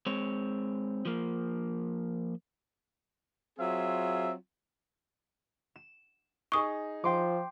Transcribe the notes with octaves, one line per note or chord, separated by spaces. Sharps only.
G#3 C4 C#5
F3 A#3
F#3 C4 F4 G#4 E5
E7
D#4 G#4 C#6 D#6
F3 G5 C6 D6